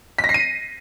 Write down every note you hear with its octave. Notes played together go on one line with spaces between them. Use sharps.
B6
A#6
C7
D#7